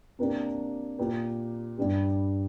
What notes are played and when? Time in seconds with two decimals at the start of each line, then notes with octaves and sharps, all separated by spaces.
0.19 C3 A#3 D4 G4
0.99 A#2 A#3 G4
1.78 G2 G3 D4 G4